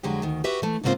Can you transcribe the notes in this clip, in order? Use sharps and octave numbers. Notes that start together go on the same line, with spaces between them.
F2 D3 F#3 G#3 G4
D2 D#3
F#4 G4 B4 E5
E3 A3
G#2 C#3 A#3 C4 F4 C5